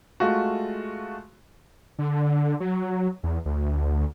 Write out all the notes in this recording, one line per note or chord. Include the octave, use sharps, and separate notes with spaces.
G#3 A3 F4 F#4
D3
F#3
E2
D2